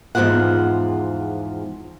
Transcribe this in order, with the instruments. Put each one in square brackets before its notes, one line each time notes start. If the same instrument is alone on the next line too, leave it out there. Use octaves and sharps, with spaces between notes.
[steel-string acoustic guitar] E2 G#2 D#3 F3 F4 F#5